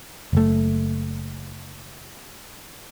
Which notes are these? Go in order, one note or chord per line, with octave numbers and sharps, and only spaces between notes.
F#1 A3